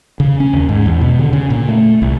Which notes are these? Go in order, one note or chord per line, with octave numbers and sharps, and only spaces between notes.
C#3
C#4
D#2
G#2
E2
B2
D3
C#3
A#2
A3
C2